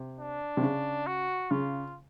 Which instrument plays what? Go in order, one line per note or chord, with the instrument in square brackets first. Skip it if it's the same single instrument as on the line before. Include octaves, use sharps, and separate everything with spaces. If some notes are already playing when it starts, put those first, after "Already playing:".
Already playing: [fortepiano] C3
[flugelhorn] D4
[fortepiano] C3
C#3
[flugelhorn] F#4
[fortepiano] C#3 [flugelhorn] F4